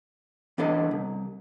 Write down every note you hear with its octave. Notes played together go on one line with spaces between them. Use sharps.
E3 B3 D4 A4 C#5 D#5
C2